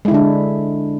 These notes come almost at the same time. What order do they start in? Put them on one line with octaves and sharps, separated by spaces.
G#3 E4 D3 D4